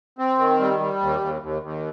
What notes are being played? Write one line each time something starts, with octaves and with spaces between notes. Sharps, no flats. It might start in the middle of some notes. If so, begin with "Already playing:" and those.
C4
D#3
G3
G3
D#2
D#2
D#2
D#2